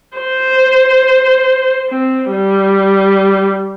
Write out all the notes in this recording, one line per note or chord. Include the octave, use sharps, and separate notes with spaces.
C5
C4
G3